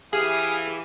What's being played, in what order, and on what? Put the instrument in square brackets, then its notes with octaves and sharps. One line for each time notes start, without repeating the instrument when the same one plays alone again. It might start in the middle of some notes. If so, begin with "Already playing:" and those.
[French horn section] E3 [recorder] G4 [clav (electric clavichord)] G#4 [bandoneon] F5 G#5 D#6